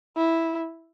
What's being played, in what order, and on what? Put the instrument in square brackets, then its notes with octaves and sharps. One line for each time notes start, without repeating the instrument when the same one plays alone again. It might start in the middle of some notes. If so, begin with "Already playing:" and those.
[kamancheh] E4